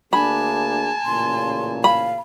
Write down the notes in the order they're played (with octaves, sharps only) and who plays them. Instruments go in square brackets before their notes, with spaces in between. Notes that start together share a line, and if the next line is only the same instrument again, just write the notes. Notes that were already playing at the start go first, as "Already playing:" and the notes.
[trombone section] D2 A#3 G#4 [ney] D4 [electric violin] G#5 A5 [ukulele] B5
[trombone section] A1 A#2 C#3 [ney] C6
[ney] F5 [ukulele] B5